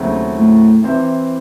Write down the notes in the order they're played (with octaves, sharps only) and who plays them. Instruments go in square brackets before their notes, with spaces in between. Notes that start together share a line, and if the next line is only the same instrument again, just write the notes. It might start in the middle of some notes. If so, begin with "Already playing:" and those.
Already playing: [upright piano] D#2 C#3 F#3 A3 C4
[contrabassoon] A2
[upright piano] C3 E3 C4 E4 C5